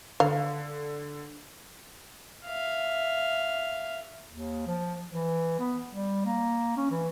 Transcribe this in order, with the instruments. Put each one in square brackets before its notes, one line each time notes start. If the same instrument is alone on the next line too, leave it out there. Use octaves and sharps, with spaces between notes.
[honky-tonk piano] D3 [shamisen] F5
[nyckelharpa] E5 F5
[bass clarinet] D#2
F3
E3
B3
G3
A#3
C#4
E3